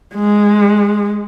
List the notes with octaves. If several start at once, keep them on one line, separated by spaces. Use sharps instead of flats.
G#3